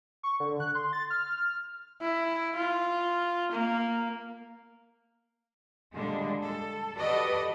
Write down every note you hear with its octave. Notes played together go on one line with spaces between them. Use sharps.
C#6
D3
F#6
C6
A6
F6
E4
F4
A#3
A#2 D3 G3 G#3
A4
F#4 G4 A4 B4 D5 D#5